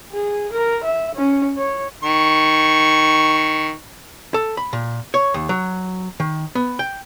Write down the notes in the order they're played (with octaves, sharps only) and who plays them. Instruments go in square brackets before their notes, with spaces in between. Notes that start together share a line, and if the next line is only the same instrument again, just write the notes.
[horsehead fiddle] G#4
A#4
E5
C#4
C#5
[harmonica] D#3 C#6
[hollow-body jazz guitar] A4
B5
A#2
C#5
D#2
F#3
D#3
B3
G5